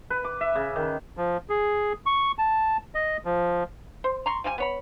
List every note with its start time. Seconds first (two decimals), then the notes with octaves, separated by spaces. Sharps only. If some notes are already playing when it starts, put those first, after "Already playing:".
0.10 B4
0.24 D6
0.41 E5
0.55 C#3
0.76 D#3
1.17 F3
1.50 G#4
2.06 C#6
2.39 A5
2.95 D#5
3.25 F3
4.04 C5
4.26 A#5 C6 C#6
4.44 F3 G3 F4 G#5
4.58 B3 C#5 B5